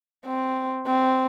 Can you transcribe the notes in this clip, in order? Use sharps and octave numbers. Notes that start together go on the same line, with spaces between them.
C4
C4